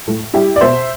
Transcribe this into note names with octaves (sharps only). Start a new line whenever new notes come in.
A2
G3 E4 G4
D5
B2 C5 E5